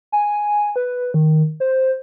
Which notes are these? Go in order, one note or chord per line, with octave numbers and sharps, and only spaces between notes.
G#5
B4
D#3
C5